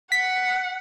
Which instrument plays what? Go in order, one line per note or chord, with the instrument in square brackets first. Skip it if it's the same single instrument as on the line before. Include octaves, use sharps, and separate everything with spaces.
[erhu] F#5 [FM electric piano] B6